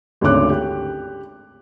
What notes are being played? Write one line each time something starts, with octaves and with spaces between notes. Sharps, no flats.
G#1 D2 C#3 C#5 D6 F#6
G4